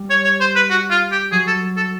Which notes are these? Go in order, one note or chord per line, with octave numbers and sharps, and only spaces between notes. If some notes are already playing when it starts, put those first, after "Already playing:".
Already playing: G3
C#5
C#5
C5
B4
F#4
F4
G4
F#3 G#4
A4
A4